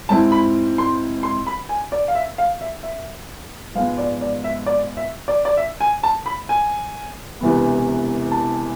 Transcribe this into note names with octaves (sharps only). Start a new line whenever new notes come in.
G#2 G#3 C4 E4 A5
B5
C6
C6
B5
G#5
D5
F5
E5
F5
E5
E5
G#2 F3 G#3 B3 F5
D5
D5
E5
D5
E5
D5
D5
E5
G#5
A5
B5
G#5
E1 E2 C3 E3 B3
A5